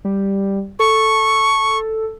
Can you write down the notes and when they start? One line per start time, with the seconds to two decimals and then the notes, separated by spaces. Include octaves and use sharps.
0.05 G3
0.79 A4 C#6